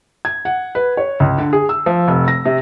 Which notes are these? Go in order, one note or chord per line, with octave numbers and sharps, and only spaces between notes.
G#6
F#5
B4
C#5
C#2
D3
G#4
E6
F3
F1
A#6
C3